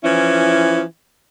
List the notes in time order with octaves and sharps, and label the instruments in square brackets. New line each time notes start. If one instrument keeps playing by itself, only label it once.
[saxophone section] E3 F3 C#4 E4